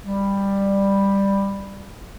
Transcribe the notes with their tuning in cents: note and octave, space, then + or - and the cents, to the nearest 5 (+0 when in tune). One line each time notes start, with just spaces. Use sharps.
G3 +10